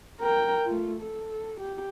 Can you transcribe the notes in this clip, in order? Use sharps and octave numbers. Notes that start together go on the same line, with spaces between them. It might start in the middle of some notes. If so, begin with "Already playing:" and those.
A#4 G5
A3 F4
A4
G4